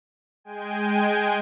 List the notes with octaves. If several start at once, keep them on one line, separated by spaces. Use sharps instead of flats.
G#3 G5 G#5